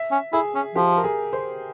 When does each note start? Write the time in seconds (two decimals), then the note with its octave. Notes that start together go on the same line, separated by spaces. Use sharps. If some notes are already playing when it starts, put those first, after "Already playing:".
Already playing: E5
0.11 C#4
0.33 E4 G#4
0.55 C#4
0.75 F3 G4
0.97 A#4
1.04 G#4
1.33 C5